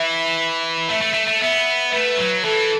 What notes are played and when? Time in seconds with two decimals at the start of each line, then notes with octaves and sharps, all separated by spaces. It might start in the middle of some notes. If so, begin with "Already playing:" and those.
Already playing: E3 E5
0.89 A3 E5
1.02 A3
1.14 A3
1.28 A3
1.41 B3 E5
1.92 A3 B4
2.18 F#3
2.44 E3 A4